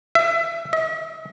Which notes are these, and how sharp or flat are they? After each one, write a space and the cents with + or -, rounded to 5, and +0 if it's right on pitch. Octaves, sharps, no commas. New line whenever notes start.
E5 +25
E5 -45